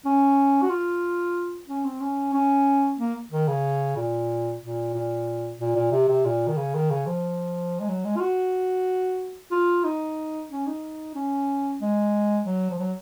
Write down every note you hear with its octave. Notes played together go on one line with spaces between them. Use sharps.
C#4
F#4
F4
C#4
C4
C#4
C#4
A#3
D#3
C#3
A#2
A#2
A#2
A#2
A#2
C3
C3
A#2
D#3
C#3
D#3
C#3
F3
G#3
F#3
G#3
F4
F#4
F4
D#4
C#4
D#4
C#4
G#3
F#3
F3
F#3